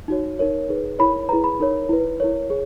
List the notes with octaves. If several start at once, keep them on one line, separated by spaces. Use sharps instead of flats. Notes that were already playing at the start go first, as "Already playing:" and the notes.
D#4 F#4 C#5
D#4 A#4 C#5
D#4 G#4 B4
E4 A#4 C#5 B5
E4 G#4 B4 A#5
B5
D#4 A#4 C#5
E4 B4
E4 A#4 C#5
G#4 C#5